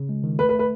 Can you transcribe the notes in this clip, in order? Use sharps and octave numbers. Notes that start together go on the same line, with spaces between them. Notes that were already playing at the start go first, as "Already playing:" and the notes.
Already playing: C#3
G#3
D#3
A3 B4
B4
A3
B4